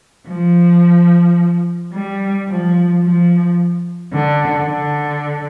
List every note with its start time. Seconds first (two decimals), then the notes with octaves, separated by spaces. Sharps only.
0.28 F3
1.93 G3
2.48 F3
3.03 F3
4.13 D3
4.68 D3